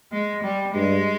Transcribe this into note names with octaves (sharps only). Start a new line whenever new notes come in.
G#3
G3
G2 G#3